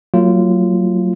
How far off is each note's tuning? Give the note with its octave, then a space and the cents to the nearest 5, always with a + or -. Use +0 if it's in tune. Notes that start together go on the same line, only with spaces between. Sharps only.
F#3 +0 A#3 -45 F4 -20